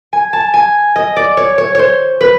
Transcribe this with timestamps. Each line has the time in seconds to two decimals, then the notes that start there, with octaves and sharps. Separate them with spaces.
0.13 G#5
0.33 A5
0.54 G#5
0.96 D#5
1.16 D5
1.37 C#5
1.58 C#5
1.75 C5 C#5
2.21 B4